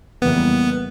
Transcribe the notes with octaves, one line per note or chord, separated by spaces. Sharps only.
F2 C#3 E3 G3 A#3 B3